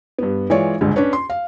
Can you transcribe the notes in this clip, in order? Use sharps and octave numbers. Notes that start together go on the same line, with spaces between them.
G2 B3
E3 G#3 F4 C#5 D5
G1 C#2 G#2 D3
C#4 D4 B4 C#5
C6
F5